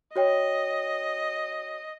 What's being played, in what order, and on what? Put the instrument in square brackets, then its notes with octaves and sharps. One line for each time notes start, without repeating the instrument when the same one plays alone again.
[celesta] F#4 C#5 G5 [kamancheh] D#5